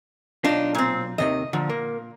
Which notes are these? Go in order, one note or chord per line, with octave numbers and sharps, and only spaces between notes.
B1 D4 D#4 F4
A#2 C4
D#2 C3 D#3 D#5
A#2 D3 F3
A#3